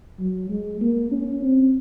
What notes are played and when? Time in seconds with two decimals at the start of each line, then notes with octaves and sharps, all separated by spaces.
0.19 F#3
0.50 G#3
0.81 A#3
1.12 C#4
1.43 C4